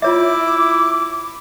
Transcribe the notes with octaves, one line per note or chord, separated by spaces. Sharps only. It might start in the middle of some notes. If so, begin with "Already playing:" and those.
E4 F4 C#5 E5 D6